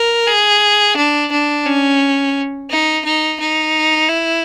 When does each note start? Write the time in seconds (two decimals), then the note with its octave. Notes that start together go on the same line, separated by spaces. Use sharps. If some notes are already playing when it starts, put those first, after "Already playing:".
Already playing: A#4
0.27 G#4
0.97 D4
1.32 D4
1.66 C#4
2.71 D#4
3.05 D#4
3.40 D#4
4.09 E4